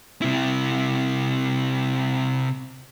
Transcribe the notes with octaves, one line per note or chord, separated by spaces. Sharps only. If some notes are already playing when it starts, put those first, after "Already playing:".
C3 E4